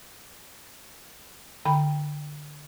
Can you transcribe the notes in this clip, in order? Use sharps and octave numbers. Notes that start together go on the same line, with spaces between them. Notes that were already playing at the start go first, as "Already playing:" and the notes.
D3 G5 B5